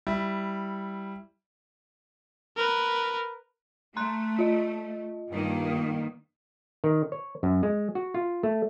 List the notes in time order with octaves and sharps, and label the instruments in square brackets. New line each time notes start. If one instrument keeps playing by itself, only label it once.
[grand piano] G3 E4
[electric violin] A#4 B4
[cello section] A3 [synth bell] A#5 C6 F#6
[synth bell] F4 D#5
[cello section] G2 D#3 A#3
[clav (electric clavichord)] D#3
C#5
F#2
G#3
F#4
F4
A3